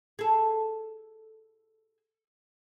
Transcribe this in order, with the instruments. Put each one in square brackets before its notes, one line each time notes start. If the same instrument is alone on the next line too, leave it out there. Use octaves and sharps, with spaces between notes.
[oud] G#4 A4